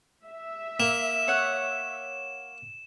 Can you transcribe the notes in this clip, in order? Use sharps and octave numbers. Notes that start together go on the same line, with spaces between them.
E5
A#3 E7
C#5 F#5